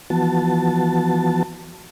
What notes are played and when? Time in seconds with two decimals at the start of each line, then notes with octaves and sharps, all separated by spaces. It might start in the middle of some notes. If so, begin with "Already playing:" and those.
0.10 E3 F3 B3 F#4 A5